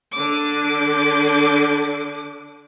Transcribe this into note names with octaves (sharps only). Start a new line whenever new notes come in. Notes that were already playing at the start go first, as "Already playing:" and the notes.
D3 D6